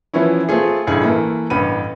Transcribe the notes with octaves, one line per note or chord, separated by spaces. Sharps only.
E3 F3 B3 C#4 E4
A3 C4 F4 G#4
A1 G2 E4 G#4
E3 A3 A#3
A1 G2 B3 B5 D#7